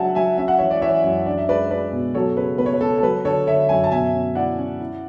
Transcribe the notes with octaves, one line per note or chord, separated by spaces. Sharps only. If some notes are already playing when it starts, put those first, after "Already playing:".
Already playing: C#3 F#3 D4 E5 F#5 G#5 A5
F#3 E5 G#5
C#4 E5
F#5
E3 C#5 E5
D5
E3 C#5 E5
F#2
D4 D5
E5
G#3 B4 D5
G#3 B4 D5
B2
F#3 A4 C#5
C#3 B4
B3 B4
C#5
B4
C#3 A4
A4
F#3 B4
D3 A4 C#5
D3 C#5 E5
F#2 E5 G#5
A5
B2 E5 G#5
C#4
E4 D5 F#5
C#4
E4